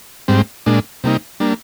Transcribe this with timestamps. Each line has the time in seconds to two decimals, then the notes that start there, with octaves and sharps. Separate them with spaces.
0.28 G#2 G3 C4
0.66 A#2 G#3 D4
1.04 C3 G3 A#3 D#4
1.40 G3 A#3 D4